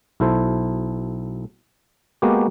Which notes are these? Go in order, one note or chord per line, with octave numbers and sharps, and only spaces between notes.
B1 E4 A4 C5
G#3 A#3 B3 F#4 G4